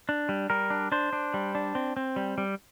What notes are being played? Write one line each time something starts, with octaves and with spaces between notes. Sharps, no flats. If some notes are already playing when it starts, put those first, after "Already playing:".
D4
G3
G3 A#4
D4
D4 C5
D4
G3
D4
C4
C4
G3
G3